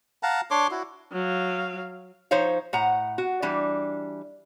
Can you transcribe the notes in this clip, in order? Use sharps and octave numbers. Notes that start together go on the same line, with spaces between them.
F5 F#5 A5 A#5
D4 C#5 C6 D6
E4 F#4
F#3 F5
F3 D#4 C5 C#5 F5
A2 F#5 A#5
F#4
E3 G3 D4